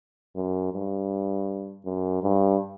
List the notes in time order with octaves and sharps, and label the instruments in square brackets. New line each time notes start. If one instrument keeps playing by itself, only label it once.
[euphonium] F#2
G2
F#2
G2